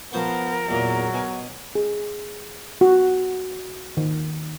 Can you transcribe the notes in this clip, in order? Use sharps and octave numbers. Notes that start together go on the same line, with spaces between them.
F3 B3 A#4 C5 C#6
E2 A#2 F#3
B2 G#5
G#4
F#4
D#3